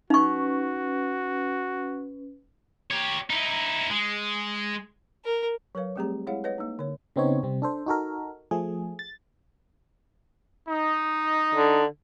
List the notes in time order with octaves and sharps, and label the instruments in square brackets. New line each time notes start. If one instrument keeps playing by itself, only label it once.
[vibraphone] C#4 B4 [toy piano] D#4 C#6 [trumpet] F#4
[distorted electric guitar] G4 C#5
D#4 E4
G#3
[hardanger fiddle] A#4
[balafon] F#3 A#4 B4 C#5 F5
G3 A3 C4 G4 G#4 A#5
G#3 E4 G#4 C#5 F5 F#5
B4 C#5 D#5 F#5
A#3 D#4
D3 C#5
[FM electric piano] C#3 B3 C4 D#4 C#5
C3 G3 C4
D4 A4 C5
D#4 F#4 A4 A#4
F3 A3 G#4
A6
[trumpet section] D#4
[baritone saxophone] D3